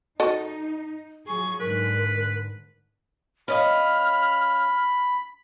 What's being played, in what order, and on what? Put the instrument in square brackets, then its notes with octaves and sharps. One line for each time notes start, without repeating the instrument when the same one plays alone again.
[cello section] D#4 [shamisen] F#4 A4 D#5
[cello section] F3 F#3 G#4 [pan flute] C#6
[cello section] G#2 D3 [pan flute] A#4 [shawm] B4
[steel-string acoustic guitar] C#4 D#5 F5 [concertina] B5 [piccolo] F6